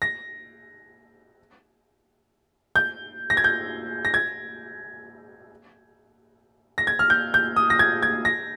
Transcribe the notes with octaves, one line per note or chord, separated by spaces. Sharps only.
A#6
G6
A#6
G#6
G6
A#6
G#6
A#6
G#6
F6
G6
G6
D#6
A#6
G#6
G#6
A#6